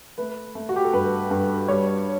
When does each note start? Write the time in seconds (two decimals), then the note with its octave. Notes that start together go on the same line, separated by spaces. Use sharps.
0.18 A3 B4
0.55 A3
0.69 F#4
0.76 G4
0.85 A4
0.93 G2 B4
1.30 G2
1.68 G3 C#5